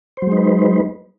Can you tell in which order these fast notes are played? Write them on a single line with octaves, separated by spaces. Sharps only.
C5 F#3 G#3 D#4 B4